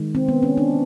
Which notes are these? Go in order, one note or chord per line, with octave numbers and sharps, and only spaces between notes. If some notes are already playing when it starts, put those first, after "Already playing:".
Already playing: D#3 G#3
C4
B3
C#4
D4